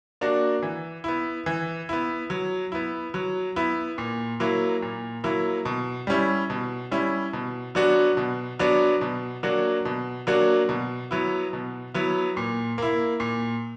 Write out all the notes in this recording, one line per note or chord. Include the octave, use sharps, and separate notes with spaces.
A#3 D4 F#4
E3
B3 E4
E3
B3 E4
F#3
B3 E4
F#3
B3 E4
A#2
F#3 A#3 E4
A#2
F#3 A#3 E4
B2
G3 C#4 E4
B2
G3 C#4 E4
B2
F#3 B3 D4 F#4
B2
F#3 B3 D4 F#4
B2
F#3 A#3 D4 F#4
B2
F#3 A#3 D4 F#4
B2
F#3 B3 E4
B2
F#3 B3 E4
A#2
A#3 E4
A#2